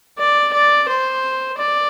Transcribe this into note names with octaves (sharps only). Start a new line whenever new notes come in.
D5
D5
C5
D5